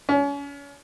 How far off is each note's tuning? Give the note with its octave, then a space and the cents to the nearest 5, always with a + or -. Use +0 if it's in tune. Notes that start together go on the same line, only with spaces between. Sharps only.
C#4 +35